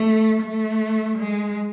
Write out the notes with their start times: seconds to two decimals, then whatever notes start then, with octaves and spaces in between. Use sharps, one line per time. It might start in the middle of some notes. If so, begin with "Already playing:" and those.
Already playing: A3
0.42 A3
1.19 G#3